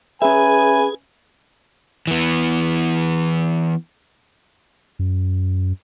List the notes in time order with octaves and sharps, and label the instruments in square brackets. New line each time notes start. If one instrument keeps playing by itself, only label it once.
[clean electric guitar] C#4 E5 [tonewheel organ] G#4 [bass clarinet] B4 [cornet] G#5
[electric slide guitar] E3 B3
[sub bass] F#2